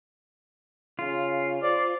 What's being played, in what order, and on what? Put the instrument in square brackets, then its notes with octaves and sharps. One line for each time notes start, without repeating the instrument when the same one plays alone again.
[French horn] C#3 [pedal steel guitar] F4
[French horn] C5 [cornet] D5